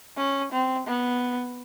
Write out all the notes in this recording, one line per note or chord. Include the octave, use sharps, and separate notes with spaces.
C#4
C4
B3